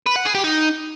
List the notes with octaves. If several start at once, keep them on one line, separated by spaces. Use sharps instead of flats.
B4
F#5
G#4
G4
D#4